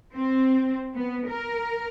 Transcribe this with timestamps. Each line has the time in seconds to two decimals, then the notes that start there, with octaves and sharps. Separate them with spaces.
0.14 C4
0.94 B3
1.27 A#4